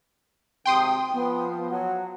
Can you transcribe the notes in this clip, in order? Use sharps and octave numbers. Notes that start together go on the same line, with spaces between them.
G#1 C3 G5 C6 D#6
F3 B3
F#3 F#5